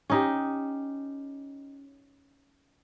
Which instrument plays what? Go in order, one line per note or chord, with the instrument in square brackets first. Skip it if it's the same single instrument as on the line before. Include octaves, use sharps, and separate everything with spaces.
[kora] C#4 D#4 G4